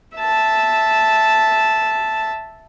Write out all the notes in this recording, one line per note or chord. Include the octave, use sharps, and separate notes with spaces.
E5 A5